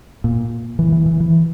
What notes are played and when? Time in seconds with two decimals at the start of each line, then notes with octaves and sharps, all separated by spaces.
0.24 A#2
0.79 E3
0.92 E3
1.06 E3
1.20 E3